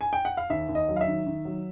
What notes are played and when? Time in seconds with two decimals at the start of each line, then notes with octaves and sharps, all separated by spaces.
0.01 G#5
0.13 G5
0.25 F#5
0.37 F5
0.50 D#2 E5
0.69 D#2
0.75 D#5
0.89 F#3
0.96 F5
1.01 E5
1.07 D#3
1.26 D#3
1.45 F#3